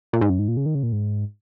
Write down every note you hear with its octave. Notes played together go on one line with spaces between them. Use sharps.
A#2
G#2
F#2
G#2
A#2
C#3
D#3
C#3
A#2
G#2